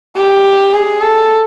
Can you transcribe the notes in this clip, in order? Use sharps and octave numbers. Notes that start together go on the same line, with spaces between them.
G4
G#4
A4